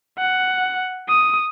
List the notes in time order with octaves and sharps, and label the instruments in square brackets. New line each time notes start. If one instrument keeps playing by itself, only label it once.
[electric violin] F#5
D#6